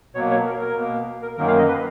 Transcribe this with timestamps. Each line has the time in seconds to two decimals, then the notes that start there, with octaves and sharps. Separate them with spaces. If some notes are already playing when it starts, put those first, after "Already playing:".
0.15 B2 F#3 A#3 C#5
0.30 C#5
0.46 A#4
0.61 A#4
0.76 B2 A#3
1.22 A#4
1.37 F#2 D#3 F#3 A#3 A#4
1.48 F5
1.58 D#5
1.68 B4